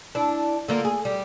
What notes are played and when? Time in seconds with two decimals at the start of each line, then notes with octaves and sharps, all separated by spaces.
0.15 D4 E4
0.68 D3 A#3 F4
0.85 G#4
1.05 G3